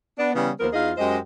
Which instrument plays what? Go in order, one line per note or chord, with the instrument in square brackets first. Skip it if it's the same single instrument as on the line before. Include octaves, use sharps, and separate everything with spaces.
[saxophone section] B3 D4
C#3 E3 G3 B3
D#2 F3 A#3 B3 A#4 C5
E2 D#4 F4 G#4 D#5 F5
F#2 G#3 G4 C5 D#5